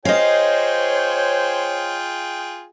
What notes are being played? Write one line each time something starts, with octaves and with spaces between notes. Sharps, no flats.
F4 G#4 C5 C#5 D#5 F5 G5